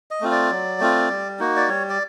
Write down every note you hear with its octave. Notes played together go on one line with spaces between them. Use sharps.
D#5
A3 C4 F4
D5
F#3
A3 C4 F4
G3
A#3 D#4 F#4
D5
G3 C#5
D5